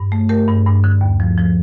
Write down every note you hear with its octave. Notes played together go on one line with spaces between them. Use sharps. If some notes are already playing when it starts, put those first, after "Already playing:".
Already playing: G2
A3
A3 G4 A#4
G2
G2
D3
D#2
F3
F3